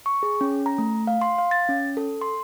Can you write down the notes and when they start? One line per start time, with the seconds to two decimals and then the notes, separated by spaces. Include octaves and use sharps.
0.06 C#6
0.23 G#4
0.41 C#4
0.66 A#5
0.78 A3
1.07 F5
1.22 C6
1.38 F5
1.51 A6
1.69 C#4
1.97 A4
2.21 C6